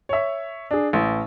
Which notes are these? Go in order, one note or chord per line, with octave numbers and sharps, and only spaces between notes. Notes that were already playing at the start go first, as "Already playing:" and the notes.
C#5 E5
D4 G#4
A1